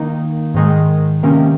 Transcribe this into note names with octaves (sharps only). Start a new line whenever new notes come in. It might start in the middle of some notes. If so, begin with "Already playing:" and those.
Already playing: D#3 A#3 D#4
G#2 D#3 G#3
C3 D#3 A#3 C#4